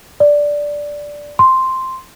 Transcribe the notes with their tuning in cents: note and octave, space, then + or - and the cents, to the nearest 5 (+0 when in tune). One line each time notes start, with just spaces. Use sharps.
D5 -5
C6 +0